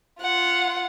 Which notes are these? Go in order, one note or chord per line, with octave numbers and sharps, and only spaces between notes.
F4 F#5